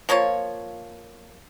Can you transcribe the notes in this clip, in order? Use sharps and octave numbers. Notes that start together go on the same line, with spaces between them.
F3 A#3 F4 C#5